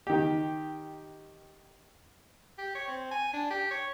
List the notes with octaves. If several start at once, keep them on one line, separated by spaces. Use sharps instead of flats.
D#3 G4
G4
C#5
C4
G#5
D4
G4
C#5